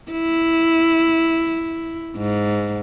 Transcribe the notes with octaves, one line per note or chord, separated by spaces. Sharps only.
E4
G#2